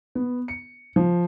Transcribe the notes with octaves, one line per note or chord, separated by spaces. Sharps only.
B3
C#7
F3